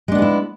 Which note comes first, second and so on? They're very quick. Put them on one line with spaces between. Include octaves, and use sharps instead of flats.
G#3 D4 B3 G#4 E4